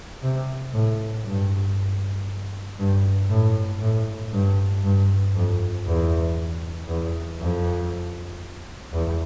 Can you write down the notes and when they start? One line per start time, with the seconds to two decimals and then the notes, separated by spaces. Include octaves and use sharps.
0.22 C3
0.73 A2
1.25 G2
2.79 G2
3.30 A2
3.80 A2
4.32 G2
4.83 G2
5.35 F2
5.86 E2
6.88 E2
7.39 F2
8.93 E2